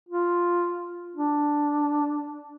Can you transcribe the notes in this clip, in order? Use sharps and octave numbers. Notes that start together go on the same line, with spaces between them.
F4
D4